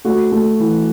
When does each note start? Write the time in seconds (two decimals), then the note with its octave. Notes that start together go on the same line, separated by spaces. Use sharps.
0.05 A3 F#4
0.32 A3
0.60 E3